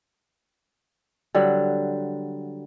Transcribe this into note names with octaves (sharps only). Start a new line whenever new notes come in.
D3 F#3 G3